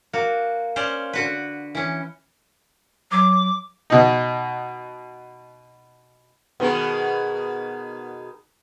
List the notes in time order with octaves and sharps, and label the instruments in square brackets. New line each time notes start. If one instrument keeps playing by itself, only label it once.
[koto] A#3 F#4
C#4 C5 D5 F5
D3 F#4 B4
E3 C#4
[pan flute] F#3 [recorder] D6
[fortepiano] B2 D#4
[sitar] B2 D#3 G#3 [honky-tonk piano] B3 B4